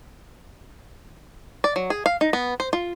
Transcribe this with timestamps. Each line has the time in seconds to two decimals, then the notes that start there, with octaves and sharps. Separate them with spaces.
1.64 D5
1.76 F#3
1.90 G#4
2.06 F5
2.21 D#4
2.33 B3
2.60 C5
2.73 F4